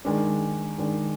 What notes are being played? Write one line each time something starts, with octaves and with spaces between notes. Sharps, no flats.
D#3 G#3 D4
D#3 G#3 D4